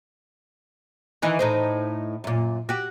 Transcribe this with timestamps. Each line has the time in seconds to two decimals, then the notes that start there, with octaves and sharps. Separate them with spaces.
1.22 D#3 E3 D#4
1.39 A2 D#4 C5
2.24 F#2 A#2
2.69 F#4 G4